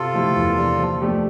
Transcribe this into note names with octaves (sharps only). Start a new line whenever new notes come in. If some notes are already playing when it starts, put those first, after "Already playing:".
Already playing: C3 F4 A4
F3 A3 E4 G4
E2
C3 F3 A#3 D4
F3
A3 D4 G4